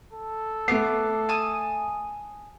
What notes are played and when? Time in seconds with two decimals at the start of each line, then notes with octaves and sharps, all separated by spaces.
0.13 A4
0.68 A3 B3 D6 C7
1.29 G#5 A5 D#6